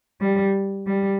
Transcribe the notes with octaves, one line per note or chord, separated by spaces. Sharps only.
G3
G3